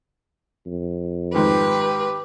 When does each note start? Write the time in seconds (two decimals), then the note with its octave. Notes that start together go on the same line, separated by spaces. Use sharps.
0.66 F2
1.35 G#2 D#3 G4 B4